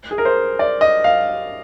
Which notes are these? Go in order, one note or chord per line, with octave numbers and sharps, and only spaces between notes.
G#4
A#4
C5
D5
D#5
F5